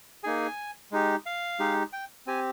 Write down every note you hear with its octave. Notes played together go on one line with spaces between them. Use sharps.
A#3 D#4 G#4 G#5
G#3 D#4 G4
F5
G#3 D#4 G4
G5
C4 G4 G#5